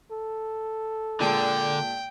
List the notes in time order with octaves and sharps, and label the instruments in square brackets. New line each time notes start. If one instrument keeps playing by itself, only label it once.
[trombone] A4
[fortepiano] A#2 G#3 A5 [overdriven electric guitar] D3 [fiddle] G5